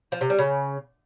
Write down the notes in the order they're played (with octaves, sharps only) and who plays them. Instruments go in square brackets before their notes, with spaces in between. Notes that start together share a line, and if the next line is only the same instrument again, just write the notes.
[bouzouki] F3
C3
G3
C#3